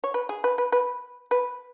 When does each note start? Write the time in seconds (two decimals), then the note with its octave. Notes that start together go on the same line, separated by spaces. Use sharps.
0.04 C#5
0.14 B4
0.29 G#4
0.44 B4
0.58 B4
0.72 B4
1.31 B4